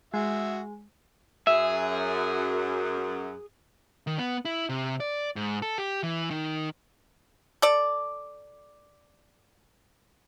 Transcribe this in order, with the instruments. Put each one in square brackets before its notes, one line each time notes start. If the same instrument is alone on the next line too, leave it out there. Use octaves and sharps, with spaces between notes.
[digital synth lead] G#3 [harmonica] F#4 G#4 E5
[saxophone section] F#2 [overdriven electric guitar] G#4 [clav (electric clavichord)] E5
[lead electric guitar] D#3
B3
E4
C3
D5
G#2
A4
G4
E3
D#3
[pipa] A4 D5